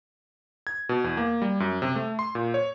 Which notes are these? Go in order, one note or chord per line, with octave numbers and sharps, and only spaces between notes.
G#6
B2
E2
A#3
G3
F#2
C3
A3
C6
A#2
C#5